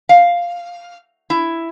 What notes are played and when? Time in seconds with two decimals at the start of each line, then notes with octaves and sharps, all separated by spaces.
0.09 F5
1.30 E4